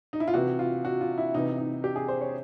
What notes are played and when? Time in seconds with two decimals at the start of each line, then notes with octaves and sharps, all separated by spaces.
0.13 D#4
0.20 E4
0.27 F4
0.34 C3 E3 F#4
0.59 F4
0.85 F#4
1.01 F4
1.18 E4
1.34 C3 E3 D#4
1.58 D#4
1.84 G4
1.96 G#4
2.08 C5
2.21 C#5